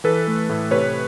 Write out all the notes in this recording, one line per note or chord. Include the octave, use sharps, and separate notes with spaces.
E3 A4 B4
A3
A2
C3 B4 C#5